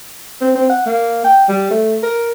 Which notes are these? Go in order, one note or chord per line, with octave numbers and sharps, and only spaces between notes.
C4
C4
F#5
A#3
G5
G3
A3
A#4